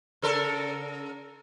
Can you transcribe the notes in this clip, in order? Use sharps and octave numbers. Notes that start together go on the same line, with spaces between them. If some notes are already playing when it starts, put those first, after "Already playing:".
C#3 A4 A#4